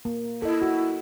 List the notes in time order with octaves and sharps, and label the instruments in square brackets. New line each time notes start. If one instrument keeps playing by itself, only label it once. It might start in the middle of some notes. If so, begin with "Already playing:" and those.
[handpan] A#3
[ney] E4 [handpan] A4 D#5
[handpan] F#4